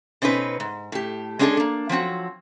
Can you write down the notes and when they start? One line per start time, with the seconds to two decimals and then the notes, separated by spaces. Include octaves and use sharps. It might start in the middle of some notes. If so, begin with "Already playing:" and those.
0.22 B2 C4 C#4 D#4 B4
0.60 G#2
0.92 A2 G4
1.39 G#3 C#4 D4 E4 G#4 A4
1.57 A#3 D4
1.89 F3 F#3 C4 F#4